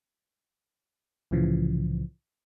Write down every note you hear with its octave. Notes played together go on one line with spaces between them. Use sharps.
C2 A2 C#3 E3 F3